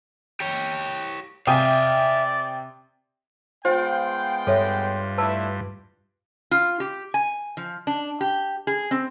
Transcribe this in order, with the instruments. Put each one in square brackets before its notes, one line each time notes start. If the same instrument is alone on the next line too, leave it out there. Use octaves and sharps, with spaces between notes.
[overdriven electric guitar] G4 C#5
[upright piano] C3 G#5 [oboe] D5 [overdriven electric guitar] E5 F5 [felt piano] G5 D#6
[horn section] G#3 B3 G5 [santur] F4 [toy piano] C5
[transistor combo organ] G2 [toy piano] A4 C#5 E5
[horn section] A3 D4 E4 [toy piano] B4 A5 E6
[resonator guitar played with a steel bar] F4
G4
G#5
F3
D4
G4
G#4
C4